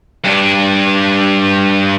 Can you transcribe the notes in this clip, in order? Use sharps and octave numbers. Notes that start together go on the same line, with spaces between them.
G2 D4